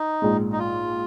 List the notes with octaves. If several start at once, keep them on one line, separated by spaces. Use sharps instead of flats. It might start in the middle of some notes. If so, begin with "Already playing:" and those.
Already playing: D#4
A#1 G#2 G#3
D#4
F4